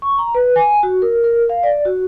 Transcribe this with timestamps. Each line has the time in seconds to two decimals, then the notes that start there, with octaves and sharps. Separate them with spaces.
0.02 C#6
0.18 A#5
0.35 B4
0.56 G#5
0.83 F#4
1.02 A#4
1.24 A#4
1.49 F5
1.63 D5
1.85 F#4